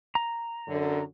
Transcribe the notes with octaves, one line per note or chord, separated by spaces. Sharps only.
A#5
F#2 D3